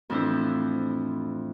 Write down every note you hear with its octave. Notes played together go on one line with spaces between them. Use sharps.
F2 A2 E3 D4 E4 C5